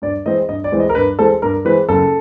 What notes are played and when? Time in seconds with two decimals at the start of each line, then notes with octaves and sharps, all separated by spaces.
0.02 G2 D5
0.26 E3 G#3 C4 D#5
0.49 G2 D#5
0.64 D5
0.72 E3 G#3 C4
0.80 D#5
0.89 A#4
0.95 G2 B4
1.18 E3 G#3 C4 A4
1.42 G2 A#4
1.65 E3 G#3 C4 B4
1.89 F#1 A4